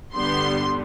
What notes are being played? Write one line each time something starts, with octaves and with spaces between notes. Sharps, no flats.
G2 D3 G3 B3 C6